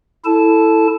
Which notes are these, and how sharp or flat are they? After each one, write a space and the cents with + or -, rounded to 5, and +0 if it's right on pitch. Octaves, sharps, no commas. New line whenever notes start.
E4 +0 A4 +5 A5 -15